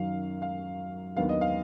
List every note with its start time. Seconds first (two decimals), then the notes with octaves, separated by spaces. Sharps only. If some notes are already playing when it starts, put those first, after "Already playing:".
Already playing: F#2 D#3 F#3 F5
0.42 F5
1.16 D#2 D#3 F#3 B3 D4 F5
1.29 D#5
1.41 F5